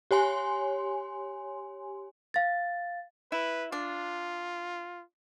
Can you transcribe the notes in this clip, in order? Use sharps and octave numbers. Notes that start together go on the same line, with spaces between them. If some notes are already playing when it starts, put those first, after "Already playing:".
G4 C#5 G#5 C6
F5 A6
E4 B4
D4 F4